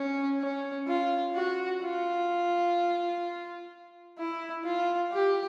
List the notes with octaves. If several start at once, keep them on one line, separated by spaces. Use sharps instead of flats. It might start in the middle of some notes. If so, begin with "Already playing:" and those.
Already playing: C#4
C#4
F4
F#4
F4
E4
F4
G4